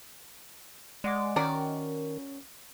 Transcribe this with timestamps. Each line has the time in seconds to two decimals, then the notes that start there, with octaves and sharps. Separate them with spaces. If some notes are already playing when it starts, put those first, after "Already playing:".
1.04 G#3 D5 F#5 D6
1.36 D#3 C#4 F#4 A#4 D5